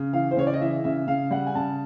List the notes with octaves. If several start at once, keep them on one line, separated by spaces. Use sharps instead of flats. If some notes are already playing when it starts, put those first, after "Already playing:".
Already playing: C#3
E3 F5
C5
C#3 C#5
D5
D#5
E3 E5
C#3 E5
C#3 F5
G3 F#5
G#5
C#3 A5